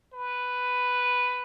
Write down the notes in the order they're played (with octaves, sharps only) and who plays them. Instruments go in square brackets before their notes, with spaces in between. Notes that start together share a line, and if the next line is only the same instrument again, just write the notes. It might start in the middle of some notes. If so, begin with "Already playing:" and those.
[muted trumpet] B4